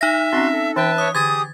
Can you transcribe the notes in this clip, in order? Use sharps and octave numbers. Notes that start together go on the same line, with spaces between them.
D#4 E5 A#6
C4 C#4 F#4 C6
A4
E3 B4 E5 G5 A5
C#5 D#6
D3 G4 G#4 D6 D#6 G#6 A6